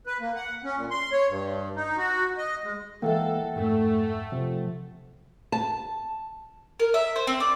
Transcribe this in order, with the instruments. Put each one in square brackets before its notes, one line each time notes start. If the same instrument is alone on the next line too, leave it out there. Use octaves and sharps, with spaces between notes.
[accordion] B4
A#3
F#5
C#4
A#2
C6
C#5
G2
D#4
F#4
D#5
G#3
[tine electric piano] E3 G#3 A#3 [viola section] A4 [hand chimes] E5 F#5 G5
[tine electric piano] F2 G#2 [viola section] A3
[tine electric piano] C3 F3
[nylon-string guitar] A5
[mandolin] A#4
E5
C5
C4
D5